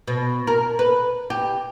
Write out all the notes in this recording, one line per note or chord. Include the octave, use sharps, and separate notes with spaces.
B2
A#4
B4
G4